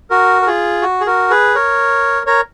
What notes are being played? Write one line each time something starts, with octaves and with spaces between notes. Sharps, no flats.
F#4 A#4
A#4
F4 G#4
F#4
G#4
F#4 A#4
G#4 B4
A#4 C#5
A#4 C#5